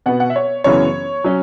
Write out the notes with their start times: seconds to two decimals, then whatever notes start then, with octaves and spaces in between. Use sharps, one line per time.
0.06 B2 B3 F#5
0.20 F#5
0.30 E5
0.36 C#5
0.64 F#2 C#3 E3 B3 C#5
1.24 F#3 C#4